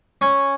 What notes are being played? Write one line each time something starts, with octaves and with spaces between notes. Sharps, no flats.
C#4